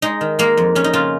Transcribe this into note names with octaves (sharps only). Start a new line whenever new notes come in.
G#3 D#4
D#3
G#3 A#3
F2
F2 C#4
D#4
C#3 F4